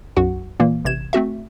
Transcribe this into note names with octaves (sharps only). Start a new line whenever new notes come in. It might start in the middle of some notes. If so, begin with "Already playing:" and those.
B1 F#2 F#4 F#5
A#2 E3 A#3
A1 C3 G#6 E7
A3 C4 F#4 E5